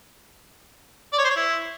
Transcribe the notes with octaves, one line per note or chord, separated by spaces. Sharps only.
D5
C#5
C5
C#5
E4